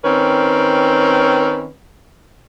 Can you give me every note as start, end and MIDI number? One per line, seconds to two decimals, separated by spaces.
0.04 1.69 51
0.04 1.69 60
0.04 1.69 61
0.04 1.69 71